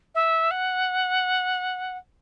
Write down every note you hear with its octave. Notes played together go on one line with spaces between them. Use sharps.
E5
F#5